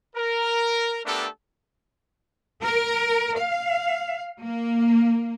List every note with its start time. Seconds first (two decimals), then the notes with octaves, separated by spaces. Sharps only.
0.16 A#4
1.06 A3 B3 D4 G4 A4 A#4
2.62 A#4
3.36 F5
4.44 A#3